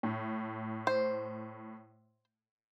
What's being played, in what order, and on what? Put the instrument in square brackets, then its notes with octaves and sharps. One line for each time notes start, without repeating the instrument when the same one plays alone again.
[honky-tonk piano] A2
[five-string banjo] C5